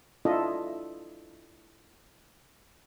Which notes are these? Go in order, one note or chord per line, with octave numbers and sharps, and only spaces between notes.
D4 E4 F4 A4 D#5 E5